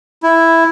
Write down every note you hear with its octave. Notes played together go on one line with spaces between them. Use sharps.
E4